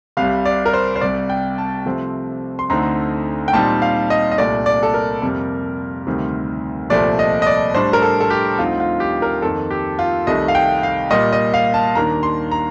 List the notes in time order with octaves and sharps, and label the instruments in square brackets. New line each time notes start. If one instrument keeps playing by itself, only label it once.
[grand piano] C2 C3 G3 F5
D5
A#4
C5
C5
C2 C3 G3 D5
G5
A5
C3 F3 A3 C4
C6
D2 D3 A3 C4 D#4 A#5
G5
A#2 G3 C4 D#4 A5
F5
D#5
D#5
C2 A#2 A3 D5
D5
A4
A#4
F2 C3 G3 A#3
D2 C3 D#3 G3 C4
C2 A#2 F3 A3 D5
D#5
D#5
D5
A2 G3 D4 C5
A#4
A4
A4
G4
D2 D3 F3 C4 D#4 F4
F4
G4
A#4
F2 D#3 A#3 D#4 A4
G4
F4
C2 C3 D#3 A3 D#5
F5
G5
F5
A#2 G3 A#3 D#5
D#5
F5
A5
D#2 D#3 A#3 D4 A#5
C6
A#5